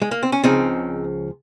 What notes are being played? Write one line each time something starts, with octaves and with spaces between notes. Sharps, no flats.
G#3
A#3
C4
C#4
C#2 C#3 F3 C4 D#4